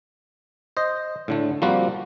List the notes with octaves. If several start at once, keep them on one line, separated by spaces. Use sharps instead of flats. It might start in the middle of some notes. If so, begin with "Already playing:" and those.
C5 D#5
A2 D3 A3
F3 G3 A#3 C4 F#4